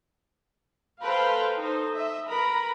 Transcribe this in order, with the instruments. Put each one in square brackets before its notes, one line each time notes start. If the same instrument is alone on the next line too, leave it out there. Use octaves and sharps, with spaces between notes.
[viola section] A4 B4 C5 F5 G5 A#5
D#4 A4 C5
D#5 E5
A#4 B4 A#5 B5